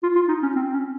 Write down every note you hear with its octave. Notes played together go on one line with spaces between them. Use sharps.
F4
F4
D#4
C#4
C4
C#4